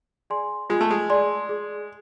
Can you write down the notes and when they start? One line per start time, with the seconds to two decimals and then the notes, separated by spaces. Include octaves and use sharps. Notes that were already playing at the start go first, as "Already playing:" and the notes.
0.30 G#4 D5 G#5 C6
0.70 G#3 F4
0.81 A3
0.91 G#3
1.09 G#4 D5 G#5 C6
1.49 G#4